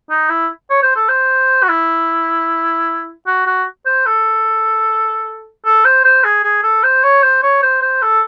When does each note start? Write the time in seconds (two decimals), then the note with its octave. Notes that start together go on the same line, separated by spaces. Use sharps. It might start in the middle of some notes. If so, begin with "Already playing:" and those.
0.10 D#4
0.30 E4
0.70 C#5
0.83 C5
0.96 A4
1.09 C5
1.63 F#4
1.69 E4
3.27 F#4
3.46 F#4
3.86 C5
4.06 A4
5.66 A4
5.85 C5
6.05 C5
6.24 G#4
6.44 G#4
6.63 A4
6.84 C5
7.04 C#5
7.23 C5
7.43 C#5
7.63 C5
7.82 C5
8.03 A4